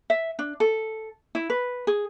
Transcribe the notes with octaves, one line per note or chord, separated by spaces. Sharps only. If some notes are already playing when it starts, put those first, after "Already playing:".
E5
D4
A4
E4
B4
G#4